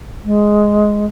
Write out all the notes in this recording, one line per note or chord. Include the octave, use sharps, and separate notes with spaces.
G#3